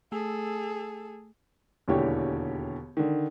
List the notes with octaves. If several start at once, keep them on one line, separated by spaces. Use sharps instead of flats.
A3 G#4 A4
E1 D#2 D3 E3 G4 C#5
D3 D#3